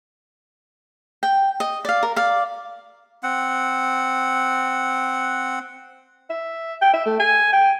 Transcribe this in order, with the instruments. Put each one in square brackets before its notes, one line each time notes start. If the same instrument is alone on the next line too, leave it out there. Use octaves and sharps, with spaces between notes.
[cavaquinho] G5
D#5
D5 F5
A#4
D5 F5
[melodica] C4 F#5
[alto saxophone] E5
G5
E5
A3
G#5
G5